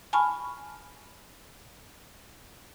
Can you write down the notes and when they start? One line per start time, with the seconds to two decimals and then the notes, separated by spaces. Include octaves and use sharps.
0.13 G#5 A5 B5 C#6 F6